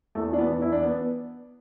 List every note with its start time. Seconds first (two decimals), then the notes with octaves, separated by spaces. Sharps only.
0.15 E2 A3
0.33 E3 D4
0.39 B3
0.50 E2
0.62 E4
0.67 E2
0.72 D4
0.83 B3